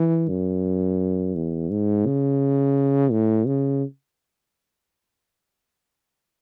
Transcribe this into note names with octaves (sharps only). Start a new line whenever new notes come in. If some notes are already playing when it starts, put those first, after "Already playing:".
Already playing: E3
F#2
E2
G#2
C#3
A2
C#3